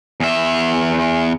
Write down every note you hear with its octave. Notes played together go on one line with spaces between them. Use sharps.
E2 E5